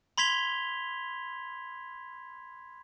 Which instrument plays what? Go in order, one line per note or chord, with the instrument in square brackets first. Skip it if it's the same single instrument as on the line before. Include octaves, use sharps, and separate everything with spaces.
[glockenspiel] B5 C6 G#6 B6 F7 G7